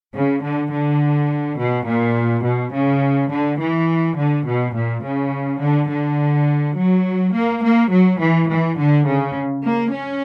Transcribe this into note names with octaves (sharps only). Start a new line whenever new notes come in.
C#3
D3
D3
B2
A#2
B2
C#3
D3
E3
D3
B2
A#2
C#3
D3
D3
F#3
A#3
A#3
F#3
E3
E3
D3
C#3
A#3
C#4